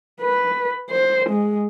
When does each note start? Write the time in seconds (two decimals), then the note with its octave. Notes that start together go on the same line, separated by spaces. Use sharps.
0.21 B4
0.90 C5
1.30 G#3